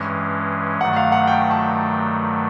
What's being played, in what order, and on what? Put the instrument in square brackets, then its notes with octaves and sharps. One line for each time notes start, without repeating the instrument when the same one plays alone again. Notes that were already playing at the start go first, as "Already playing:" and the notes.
Already playing: [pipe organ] G2 E3 G#3 C#4
[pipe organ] G2 D#3 F#3 A3 [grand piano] F#5
[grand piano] F5
F#5
G5
A5